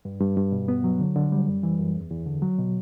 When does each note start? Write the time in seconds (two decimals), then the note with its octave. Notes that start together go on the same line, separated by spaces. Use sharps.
0.05 G2
0.21 G2
0.37 G2
0.52 B2
0.68 B3
0.84 F#3
1.00 D3
1.15 D3
1.32 G3
1.47 F#2
1.63 E3
1.79 F#2
1.95 E2
2.11 E2
2.26 D3
2.42 F#3
2.59 B2